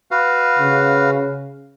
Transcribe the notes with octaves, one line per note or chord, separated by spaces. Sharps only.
F#4 B4 F5
C#3